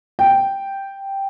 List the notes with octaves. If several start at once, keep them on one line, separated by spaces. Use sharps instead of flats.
G5